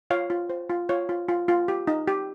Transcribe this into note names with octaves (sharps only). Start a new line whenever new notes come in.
F4 C#5 F5
F4
C5
F4
F4 C#5 F5
F4
F4
F4
G4
D#4
G4